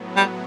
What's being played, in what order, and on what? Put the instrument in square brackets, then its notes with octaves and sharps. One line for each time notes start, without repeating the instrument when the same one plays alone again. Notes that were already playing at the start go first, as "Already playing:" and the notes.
Already playing: [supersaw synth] A2 F#3 B3
[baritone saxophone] G3